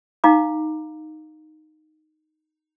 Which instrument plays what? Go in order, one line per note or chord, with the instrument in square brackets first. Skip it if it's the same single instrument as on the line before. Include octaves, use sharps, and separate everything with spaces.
[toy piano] D#4 F5 A#5 D6